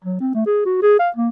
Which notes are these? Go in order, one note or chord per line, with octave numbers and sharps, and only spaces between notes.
F#3
C4
A3
G#4
F#4
G#4
F5
A#3